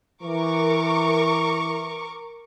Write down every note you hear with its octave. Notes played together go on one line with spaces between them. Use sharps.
E3 A#4 C#6 D6